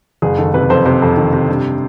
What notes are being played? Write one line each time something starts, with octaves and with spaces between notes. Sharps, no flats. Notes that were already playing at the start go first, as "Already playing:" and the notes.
F#1 G#4
D#3 A4
C3 B4
F2 C5
C3 C5
F2
D#3
C3
G2